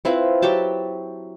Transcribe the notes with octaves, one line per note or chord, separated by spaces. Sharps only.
C4 E4 F4 B4
F#3 G4 G5 A5